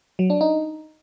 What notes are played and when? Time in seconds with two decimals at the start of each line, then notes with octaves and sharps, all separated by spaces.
0.19 F#3
0.30 D4
0.41 D#4